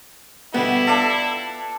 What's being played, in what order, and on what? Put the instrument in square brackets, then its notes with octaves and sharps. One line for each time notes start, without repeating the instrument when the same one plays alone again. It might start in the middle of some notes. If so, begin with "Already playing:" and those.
[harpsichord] B2 D3 G3 [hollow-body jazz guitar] B3 [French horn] E4
[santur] D4 A4 [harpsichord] F4 G5